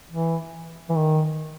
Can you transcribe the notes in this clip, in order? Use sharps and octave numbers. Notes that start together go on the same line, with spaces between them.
E3
E3
D#3